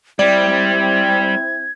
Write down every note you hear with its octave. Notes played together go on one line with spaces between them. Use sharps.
G3 C4 E4 D5 G#6